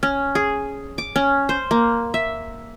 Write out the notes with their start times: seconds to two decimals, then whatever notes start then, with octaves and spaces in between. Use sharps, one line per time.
0.03 C#4
0.35 G#4
0.98 D6
1.16 C#4
1.49 C5
1.71 A#3
2.14 E5